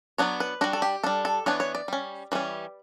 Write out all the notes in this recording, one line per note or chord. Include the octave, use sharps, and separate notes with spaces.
F#3 B3 D4 C#5
B4
G3 D4 F#4
A4
G4
G3 D4 A4
A4
E3 B3 D4 C#5
C#5
D5
G3 C#4
E3 G3 C#4